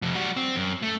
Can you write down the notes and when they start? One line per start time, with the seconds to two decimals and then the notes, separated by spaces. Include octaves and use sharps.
0.02 F2 C3
0.14 G3 F#4
0.37 C4
0.56 F#2
0.82 A3